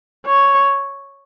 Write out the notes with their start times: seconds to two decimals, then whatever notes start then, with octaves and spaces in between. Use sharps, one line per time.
0.26 C#5